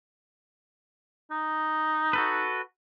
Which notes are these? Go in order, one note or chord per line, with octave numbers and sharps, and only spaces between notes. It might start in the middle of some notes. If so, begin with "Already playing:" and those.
D#4
F#4 A4 B4